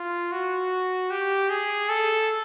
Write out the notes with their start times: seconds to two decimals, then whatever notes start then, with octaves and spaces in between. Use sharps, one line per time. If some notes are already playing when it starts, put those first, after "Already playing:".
Already playing: F4
0.32 F#4
1.10 G4
1.50 G#4
1.89 A4